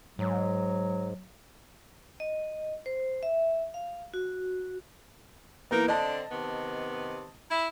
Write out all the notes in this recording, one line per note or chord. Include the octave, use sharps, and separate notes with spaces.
G#2 F#3
D#5
C5
E5
F5
F#4
E3 A#3 B3 D#4 A#4
D3 C4 D4 D#5 A5
C3 D#3 B3
E4